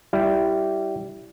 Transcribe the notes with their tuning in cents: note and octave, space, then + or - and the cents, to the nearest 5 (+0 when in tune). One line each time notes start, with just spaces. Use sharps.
G3 -15 E4 +0